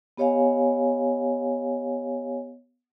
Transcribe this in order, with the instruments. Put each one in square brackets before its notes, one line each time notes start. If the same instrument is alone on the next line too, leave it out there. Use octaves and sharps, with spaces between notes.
[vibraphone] B3 G4 C#5 D#5 F5 G#5